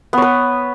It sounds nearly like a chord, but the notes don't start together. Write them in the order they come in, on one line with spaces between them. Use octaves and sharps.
B3 C#5 B4